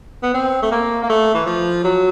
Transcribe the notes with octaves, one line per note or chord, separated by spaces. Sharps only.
B3
C4
A3
A#3
A#3
A3
E3
F3
F#3